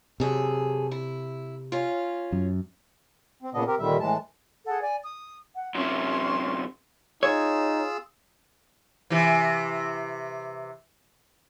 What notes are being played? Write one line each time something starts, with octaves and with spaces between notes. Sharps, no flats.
F#2 C3 G#4 A4
E4
C#4 F4
F#2
C4
A#2 C#3 B3 D4 D#5
C4 G4 A#4
D#2 A#2 D3 D#3 G3 E5
A2 E3 G#3 A5
G#4 A4 F#5
D5 G#5
D#6
F#5
F#2 C3 C#4 C6
D#4 F4 G#4 C#5 E6
C3 E3